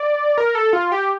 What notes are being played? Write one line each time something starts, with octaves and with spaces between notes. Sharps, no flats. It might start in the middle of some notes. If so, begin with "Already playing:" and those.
Already playing: D5
A#4
A4
F4
G4